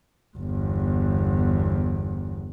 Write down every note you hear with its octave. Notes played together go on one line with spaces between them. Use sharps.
G1 E2